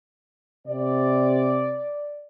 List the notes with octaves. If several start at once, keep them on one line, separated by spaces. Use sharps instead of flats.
C3 D5